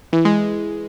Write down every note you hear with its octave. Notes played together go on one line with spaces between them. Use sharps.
E3
G#3